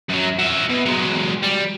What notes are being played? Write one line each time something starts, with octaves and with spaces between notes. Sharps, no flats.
F#2 F#3
F#4 E5
B2
F#3 G#3
G3